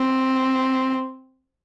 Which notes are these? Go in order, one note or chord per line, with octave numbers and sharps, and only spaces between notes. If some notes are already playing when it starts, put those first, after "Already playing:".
Already playing: C4